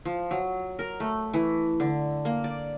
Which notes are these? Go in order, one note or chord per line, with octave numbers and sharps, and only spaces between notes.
F3
F#3
A#4
A3
E3
D3
A#3
D5